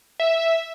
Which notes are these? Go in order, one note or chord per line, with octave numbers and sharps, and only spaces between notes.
E5